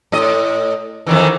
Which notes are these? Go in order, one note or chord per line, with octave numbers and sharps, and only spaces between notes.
A2 D#5
F2 D#3 E3